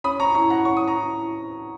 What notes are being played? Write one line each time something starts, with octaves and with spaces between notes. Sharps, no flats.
C#4 B5 D#6
A#5 C#6
E4 A#5 C#6
F#5 A#5
C#4 C#6
D#6
A#5 C#6
E4